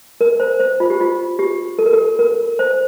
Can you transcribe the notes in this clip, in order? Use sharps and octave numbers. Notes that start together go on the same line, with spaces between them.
A#4
C5
C5
F4
G4
F4
G4
A4
A#4
A4
A#4
C5